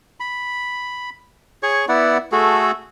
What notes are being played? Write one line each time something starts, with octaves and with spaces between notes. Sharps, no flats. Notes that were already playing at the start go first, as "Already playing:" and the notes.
B5
G#4 C#5 C#6
B3 E4 D5 F#5
A3 F#4 G#4 A4